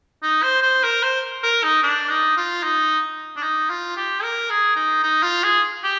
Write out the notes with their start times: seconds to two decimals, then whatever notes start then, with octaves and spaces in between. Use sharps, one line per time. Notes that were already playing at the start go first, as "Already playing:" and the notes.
0.22 D#4
0.42 C5
0.62 C5
0.83 A#4
1.02 C5
1.43 A#4
1.63 D#4
1.83 D4
2.09 D#4
2.36 F4
2.63 D#4
3.36 D4
3.42 D#4
3.70 F4
3.96 G4
4.23 A#4
4.50 G#4
4.76 D#4
5.03 D#4
5.23 F4
5.43 G#4
5.84 G4